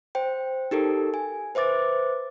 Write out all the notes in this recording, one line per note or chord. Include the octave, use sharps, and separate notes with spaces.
C5 G5
D#4 G4 A4 A#4
G#5
B4 C5 E5 D6 A6